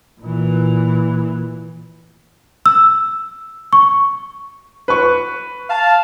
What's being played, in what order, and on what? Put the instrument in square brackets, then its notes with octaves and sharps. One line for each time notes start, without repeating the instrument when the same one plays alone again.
[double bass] A#2 E3
[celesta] E6
C#6
[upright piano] B4 C#6
[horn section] F5 A5